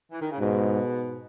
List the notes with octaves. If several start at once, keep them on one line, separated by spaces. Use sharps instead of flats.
E3
D#3
C#3
G#2 B2